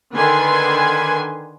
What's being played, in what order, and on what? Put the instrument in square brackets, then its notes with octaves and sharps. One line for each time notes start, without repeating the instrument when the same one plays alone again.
[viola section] D3 D#3 B4 G#5 C6